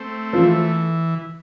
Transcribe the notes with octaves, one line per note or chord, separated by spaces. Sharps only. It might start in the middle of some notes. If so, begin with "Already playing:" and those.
Already playing: A3 C4
E3 F3